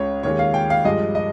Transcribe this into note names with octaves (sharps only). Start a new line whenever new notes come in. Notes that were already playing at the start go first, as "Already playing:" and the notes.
Already playing: C#2 C#3 G#3 C#5
D#2 D#3 G#3 C#5
F5
G5
F5
G2 F3 G#3 D#5
D#5